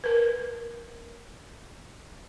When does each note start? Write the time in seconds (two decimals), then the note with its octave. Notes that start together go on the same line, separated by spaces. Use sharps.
0.04 A#4 B4